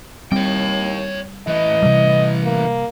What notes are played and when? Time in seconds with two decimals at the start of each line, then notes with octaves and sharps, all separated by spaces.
0.32 D#2 G3 C4 C#5 G5
1.47 E3 A3 D#5
1.83 C3 G3
2.44 A#3